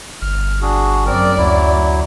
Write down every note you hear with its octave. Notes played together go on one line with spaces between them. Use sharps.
G1 F6
D4 F#4 G#4
F#2 C4 A#4 D5
D2 F#3 E4